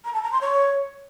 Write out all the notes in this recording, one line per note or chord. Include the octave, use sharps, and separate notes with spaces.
A#5
A5
A#5
C6
C#5